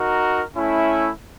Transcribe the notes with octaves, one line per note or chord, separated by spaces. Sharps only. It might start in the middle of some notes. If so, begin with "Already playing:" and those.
Already playing: D#4 F#4 A#4
A3 C#4 E4